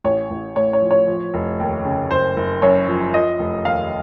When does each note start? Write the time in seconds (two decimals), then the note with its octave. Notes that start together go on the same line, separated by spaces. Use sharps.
0.04 A1 C#5
0.30 A1
0.56 A2 C#5
0.73 C#5
0.82 F3
0.91 C#5
1.08 F3
1.34 F1
1.60 D#2
1.85 C#3
2.11 F#1 C5
2.36 F#1
2.62 F#2 C#5
2.88 F3
3.14 F3 D#5
3.39 F1
3.65 D#2 F5